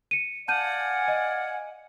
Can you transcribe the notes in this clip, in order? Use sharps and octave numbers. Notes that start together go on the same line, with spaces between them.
C#7 D#7
D5 F5 F#5 G#5 A5 G6 D#7
D#5